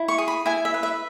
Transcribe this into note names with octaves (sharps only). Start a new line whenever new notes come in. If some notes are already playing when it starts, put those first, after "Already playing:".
Already playing: E4
C#6
G#4
B5
E4 G#5
E5
B4
E5